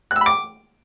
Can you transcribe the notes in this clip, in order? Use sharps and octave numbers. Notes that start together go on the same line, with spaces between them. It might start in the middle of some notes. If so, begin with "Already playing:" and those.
F#6
E6
B5
D6